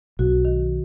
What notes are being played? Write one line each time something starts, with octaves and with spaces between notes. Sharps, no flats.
B1 F#4
D#3